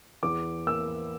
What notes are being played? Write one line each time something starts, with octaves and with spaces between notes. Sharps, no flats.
E2 D6
A#3 E6